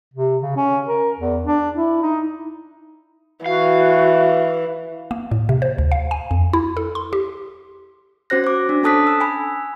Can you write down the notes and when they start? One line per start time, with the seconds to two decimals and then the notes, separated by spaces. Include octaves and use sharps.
0.14 C3
0.42 C#3
0.57 C#4
0.88 A#4
1.19 E2
1.45 D4
1.75 E4
2.02 D#4
3.46 E3 F#4 F5
5.11 A#3
5.31 A2
5.49 C3
5.62 C5
5.78 D2
5.92 F5
6.11 G#5
6.31 F2
6.53 E4
6.77 A4
6.95 C6
7.13 G4
8.30 C#4 F#4 C5 F#6 A#6
8.44 C5 D6
8.69 D4
8.83 C#4 A4 A5 D#6 F#6 B6
9.07 E6
9.21 G#5 B5